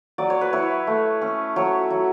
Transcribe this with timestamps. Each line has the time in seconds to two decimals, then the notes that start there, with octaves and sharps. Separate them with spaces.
0.18 F#3 D5
0.30 C#5
0.41 B4
0.53 E4 C#5
0.87 A3
1.22 C#4
1.56 F#3 C#5
1.90 F#3